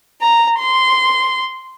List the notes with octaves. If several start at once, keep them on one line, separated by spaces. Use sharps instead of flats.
A#5
C6